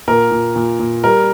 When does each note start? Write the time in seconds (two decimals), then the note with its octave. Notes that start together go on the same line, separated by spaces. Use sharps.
0.08 A#2 A#4
0.31 A#2
0.56 A#2
0.79 A#2
1.04 G3 A#4